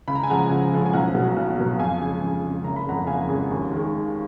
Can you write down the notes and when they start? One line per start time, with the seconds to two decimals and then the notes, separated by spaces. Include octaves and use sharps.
0.08 C#2 B5
0.15 A#5
0.23 G#5
0.30 C#3 F3 G#3 F#5 A#5
0.50 C#2
0.73 C#3 F3 G#3
0.86 G#5
0.93 B1 F#5 A#5
1.15 B2 F#3
1.37 B1
1.58 B2 F#3
1.79 F2 F5 G#5
2.00 C#3 G#3
2.22 F2
2.43 C#3 G#3
2.64 F#1 A#5
2.76 B5
2.86 F2 C#3 G#3 F#5 A#5
3.07 F#1 F5 G#5
3.29 F2 C#3 G#3
3.50 D#2
3.72 D#3 G#3